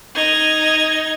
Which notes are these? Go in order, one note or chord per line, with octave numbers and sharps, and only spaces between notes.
D#4 G#6